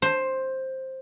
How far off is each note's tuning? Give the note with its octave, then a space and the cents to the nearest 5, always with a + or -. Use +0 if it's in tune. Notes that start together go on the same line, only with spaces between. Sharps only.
C5 +10